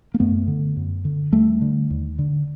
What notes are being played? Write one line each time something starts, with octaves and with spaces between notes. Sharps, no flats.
A#3
F#2 A3 B3
D3
F#2
D3
D#2 G3 A3
D3
D#2
D3